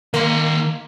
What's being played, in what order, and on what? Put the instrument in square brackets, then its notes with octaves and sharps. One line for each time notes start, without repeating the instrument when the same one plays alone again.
[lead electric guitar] D#3 C6 [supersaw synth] A#3